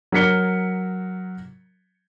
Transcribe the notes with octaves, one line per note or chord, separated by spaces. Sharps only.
F#3 A#4 B6 C#7 G7